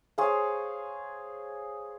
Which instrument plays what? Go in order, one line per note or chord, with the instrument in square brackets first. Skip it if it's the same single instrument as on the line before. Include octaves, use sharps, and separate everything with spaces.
[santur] G#4 C5 C#5 F5